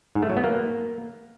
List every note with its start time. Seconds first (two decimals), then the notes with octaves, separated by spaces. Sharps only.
0.15 G#2
0.22 A3
0.30 F#3
0.37 B3
0.44 A#3